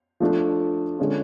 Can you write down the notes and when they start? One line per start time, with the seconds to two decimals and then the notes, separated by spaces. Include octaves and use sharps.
0.20 F3 A3 D4
0.98 D3 G#3 C#4 F4